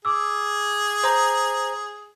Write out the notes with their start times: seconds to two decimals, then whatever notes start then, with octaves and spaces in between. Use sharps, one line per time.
0.05 G#4 D6 E6
1.04 C5 A#5